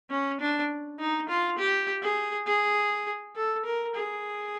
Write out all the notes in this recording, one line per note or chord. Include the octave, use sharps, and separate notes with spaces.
C#4
D4
D#4
F4
G4
G#4
G#4
A4
A#4
G#4